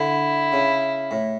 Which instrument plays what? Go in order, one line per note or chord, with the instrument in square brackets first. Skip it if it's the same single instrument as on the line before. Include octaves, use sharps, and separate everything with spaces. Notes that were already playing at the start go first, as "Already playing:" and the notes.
Already playing: [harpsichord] D3 [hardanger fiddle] E4
[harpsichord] C#3
A2